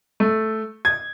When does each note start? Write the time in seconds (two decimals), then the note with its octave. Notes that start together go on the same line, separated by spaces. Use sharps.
0.20 A3
0.85 G#6